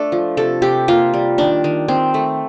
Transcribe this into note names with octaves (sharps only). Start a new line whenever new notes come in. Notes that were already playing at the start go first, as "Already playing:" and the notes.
Already playing: A3 D4 A4
F3
C3 A4
C3 G4
A#3 F4
G3
D#3 D4
D#3
D#3 C4
A3